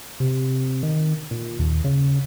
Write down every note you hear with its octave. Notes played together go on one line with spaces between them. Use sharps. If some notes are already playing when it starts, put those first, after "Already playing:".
C3
D#3
A#2
D#2
C#3